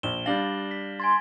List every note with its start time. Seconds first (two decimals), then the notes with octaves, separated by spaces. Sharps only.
0.03 A#1 E7 G7
0.26 G3 D4 F5 A6 A#6 F#7
0.71 B6
1.00 G#5 C6 G#6 A6